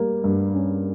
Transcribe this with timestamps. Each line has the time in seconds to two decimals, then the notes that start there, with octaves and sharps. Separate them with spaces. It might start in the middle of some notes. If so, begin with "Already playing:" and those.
Already playing: G3 A#3
0.24 G2
0.54 C#4